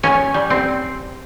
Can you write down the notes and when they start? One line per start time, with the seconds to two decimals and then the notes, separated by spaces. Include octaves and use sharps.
0.03 C#4
0.34 G3
0.50 C4